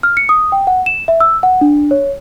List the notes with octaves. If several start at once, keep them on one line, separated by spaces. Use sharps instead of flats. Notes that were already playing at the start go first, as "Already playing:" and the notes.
F6
C#7
D#6
G5
F#5
E7
E5
E6
F#5
D4
C#5